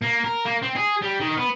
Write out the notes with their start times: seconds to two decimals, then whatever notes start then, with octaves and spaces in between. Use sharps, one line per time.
0.02 A#3
0.24 A#4
0.45 A#3
0.62 C4
0.76 G#4
1.02 G3
1.20 D#3
1.37 B3